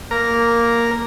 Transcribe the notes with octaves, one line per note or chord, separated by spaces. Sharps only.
A#3 A#4